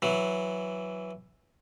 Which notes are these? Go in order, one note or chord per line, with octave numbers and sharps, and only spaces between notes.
E3 F#3